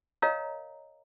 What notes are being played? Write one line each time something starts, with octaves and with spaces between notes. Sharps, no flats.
A#4 C#5 D#5 F5 A#5